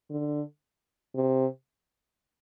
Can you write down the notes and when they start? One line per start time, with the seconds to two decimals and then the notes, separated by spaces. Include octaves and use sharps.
0.11 D3
1.15 C3